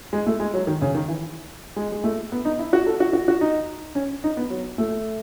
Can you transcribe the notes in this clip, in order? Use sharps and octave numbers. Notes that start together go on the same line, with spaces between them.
G#3
A3
G#3
F#3
D#3
C#3
D#3
E3
G#3
G#3
A3
B3
D#4
E4
F#4
A4
F#4
F#4
F#4
D#4
C#4
D#4
B3
F#3
A3